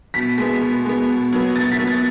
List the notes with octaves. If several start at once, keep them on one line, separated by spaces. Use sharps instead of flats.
B2 B6
G#3 B3 B6
B2
G#3 B3
B2
F#3 B3
B2 A6
B6
F#3 B3
A6